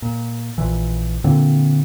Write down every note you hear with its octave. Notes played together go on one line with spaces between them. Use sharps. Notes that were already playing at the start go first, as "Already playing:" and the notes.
A#2
A#1 A#2 E3
A#2 D3 A#3 C4